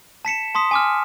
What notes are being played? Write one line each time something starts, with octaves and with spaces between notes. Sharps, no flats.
A5 B6 C#7 E7
A5 C6 D#6 B6
G#5 D6 F6